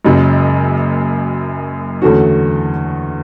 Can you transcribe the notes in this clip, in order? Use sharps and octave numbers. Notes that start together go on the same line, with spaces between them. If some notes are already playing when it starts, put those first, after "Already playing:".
F#1 F#2 C#3 G#3
E2 D3 A3 C#4 F#4